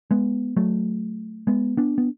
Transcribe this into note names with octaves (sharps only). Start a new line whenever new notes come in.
G#3 B3
F#3 A3
G#3 B3
B3 D4
B3